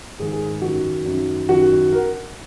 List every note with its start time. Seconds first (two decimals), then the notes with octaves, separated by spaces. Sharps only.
0.19 G#2 D#3 G#4
0.33 G#4
0.62 F#2 D#3 F#4
1.06 F#2 D#3
1.49 F#2 D#3 F#4
1.92 A#4